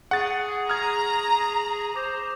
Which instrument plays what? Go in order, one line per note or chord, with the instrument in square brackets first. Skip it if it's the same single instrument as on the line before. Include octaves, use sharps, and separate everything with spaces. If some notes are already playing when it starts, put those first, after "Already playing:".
[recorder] G#4 [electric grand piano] F#5 A6 [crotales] C#6
[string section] A#5 [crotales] D#6 [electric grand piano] F6 G#6
[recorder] C5 [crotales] D6 A#6 F7